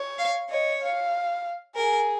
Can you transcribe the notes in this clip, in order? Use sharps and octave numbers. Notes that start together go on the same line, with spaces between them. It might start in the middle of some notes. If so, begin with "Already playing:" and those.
Already playing: C#5
F5
C#5 D#5
F5
G#4 A#4